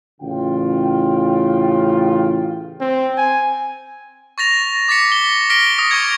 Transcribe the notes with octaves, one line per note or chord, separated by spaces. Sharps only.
A1 C#3 F4 G5
C4
G#5
C#6 A6 A#6 F7
D6 A6 B6 C#7
G7
F6 A#6 B6 D7 G7
D#6 A#6
C#6 D#6 G#6 C#7